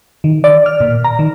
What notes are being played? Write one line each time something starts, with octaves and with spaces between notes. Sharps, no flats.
D#3
D5
F6
A#2
A#5
D#3